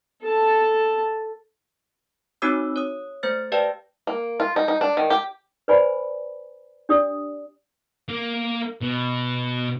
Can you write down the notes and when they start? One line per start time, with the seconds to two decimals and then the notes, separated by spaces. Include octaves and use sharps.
0.23 A4 A5
2.42 C4 D#4 F#4 C#5 D6 E6
2.76 C#5 D#6
3.23 A3 C5 F6 A6
3.52 G4 B4 D5 F5 G5 A5
4.07 A#3
4.40 F4
4.56 D#4
4.68 D#4
4.81 D4
4.97 D#3
5.10 G4
5.68 B4 C5 D5 G#5 B5
6.89 D4 G4 D5 D#6
8.09 A#3
8.81 B2